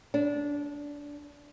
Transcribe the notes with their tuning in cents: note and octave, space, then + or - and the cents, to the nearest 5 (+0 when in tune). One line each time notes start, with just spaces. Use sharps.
D4 -20